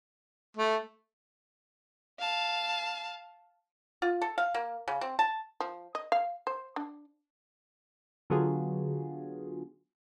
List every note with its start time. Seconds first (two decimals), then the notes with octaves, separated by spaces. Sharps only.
0.57 A3
2.19 F5 A5
4.02 F4
4.22 A4
4.38 F5
4.54 A#3
4.88 C#3
5.01 C4
5.19 A5
5.60 F3
5.95 D#5
6.12 F5
6.47 C5
6.76 D4
8.30 D3 F#3 B3 F4 F#4 G#4